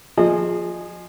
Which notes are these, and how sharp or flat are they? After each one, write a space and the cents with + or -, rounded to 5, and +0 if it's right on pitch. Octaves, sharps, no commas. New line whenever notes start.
F3 +10 G#4 +0 D#5 -35